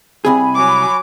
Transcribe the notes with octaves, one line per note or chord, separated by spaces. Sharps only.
C2 C3 G#4 G#5 B5
F#3 D6